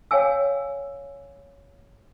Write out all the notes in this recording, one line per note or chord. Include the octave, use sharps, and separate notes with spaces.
C#5 F5 G5 G#5 E6